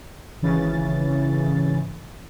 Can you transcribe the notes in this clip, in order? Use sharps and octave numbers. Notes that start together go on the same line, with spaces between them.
G#1 C#3 E3 C#4 A6